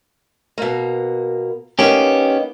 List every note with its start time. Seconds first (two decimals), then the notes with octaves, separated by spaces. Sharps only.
0.58 B2 A#3
1.79 A#3 B3 C#4 D#4 G4